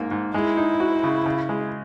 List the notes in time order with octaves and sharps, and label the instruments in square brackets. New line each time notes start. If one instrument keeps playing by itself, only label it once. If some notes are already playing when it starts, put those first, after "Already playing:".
Already playing: [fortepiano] G#2 A#3
G#2
[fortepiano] G#3 [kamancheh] E4
[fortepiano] D#4
F#4
C#3
C#3
G#3